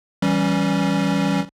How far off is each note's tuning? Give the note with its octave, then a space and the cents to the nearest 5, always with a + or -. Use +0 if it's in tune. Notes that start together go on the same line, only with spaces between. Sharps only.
E3 +0 G3 -20 C#4 +0